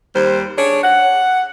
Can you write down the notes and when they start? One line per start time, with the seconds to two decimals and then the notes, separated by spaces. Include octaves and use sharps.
0.14 D#2 G3 C5
0.57 D4 G#4 C#5
0.83 F#5